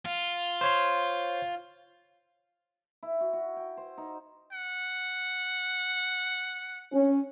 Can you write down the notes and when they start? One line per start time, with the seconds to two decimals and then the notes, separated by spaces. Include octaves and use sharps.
0.05 F4
0.61 C5 C#5 C6
3.03 E4
3.21 F#4
3.33 F#4
3.57 G5
3.77 C5
3.98 D#4
4.52 F#5
6.93 C#4